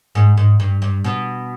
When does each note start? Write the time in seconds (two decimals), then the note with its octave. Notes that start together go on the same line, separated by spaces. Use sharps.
0.15 G#2
0.37 G#2
0.60 G2
0.82 G2
1.04 B2